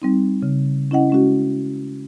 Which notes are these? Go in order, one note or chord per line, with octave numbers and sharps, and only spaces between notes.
G3 C4 D#4
C#3
C#4 E4 D#5 F#5
G#3 C#4 F#4